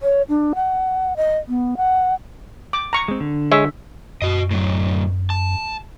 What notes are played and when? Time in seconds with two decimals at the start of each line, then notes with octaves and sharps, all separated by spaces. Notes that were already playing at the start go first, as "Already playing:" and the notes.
0.02 C#5
0.29 D4
0.55 F#5
1.16 D#5
1.49 B3
1.77 F#5
2.73 D6
2.93 A#5 C#6
3.08 G#3 C4
3.20 D3
3.52 G#3 C#5 E5
4.22 F#2 F#4 D#5
4.51 A2 F#3
5.30 A5